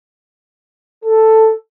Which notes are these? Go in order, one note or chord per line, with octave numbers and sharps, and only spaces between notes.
A4